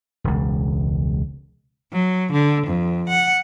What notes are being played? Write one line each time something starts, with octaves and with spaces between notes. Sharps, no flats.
E1 C#2
F#3
D3
F2
F#5